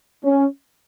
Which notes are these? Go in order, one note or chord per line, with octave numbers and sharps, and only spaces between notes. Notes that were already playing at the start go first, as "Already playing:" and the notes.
C#4